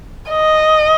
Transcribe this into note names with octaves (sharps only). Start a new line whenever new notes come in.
D#5